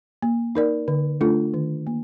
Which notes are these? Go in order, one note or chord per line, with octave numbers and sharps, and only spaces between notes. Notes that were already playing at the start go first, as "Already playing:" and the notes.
A#3
D#4 A#4 D5
D3
A3 D4 F4 A4
D#3
A#3